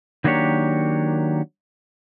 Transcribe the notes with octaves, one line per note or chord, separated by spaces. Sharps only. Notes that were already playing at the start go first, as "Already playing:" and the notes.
D#3 F#3 A#3 D4 G4 C#5